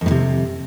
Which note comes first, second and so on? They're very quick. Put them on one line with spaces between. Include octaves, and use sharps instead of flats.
F2 A2 C3